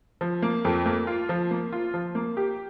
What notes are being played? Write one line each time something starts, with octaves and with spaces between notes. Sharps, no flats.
F3
A#3
F2
A#3
F4
F3
A#3
F4
F3
A#3
G4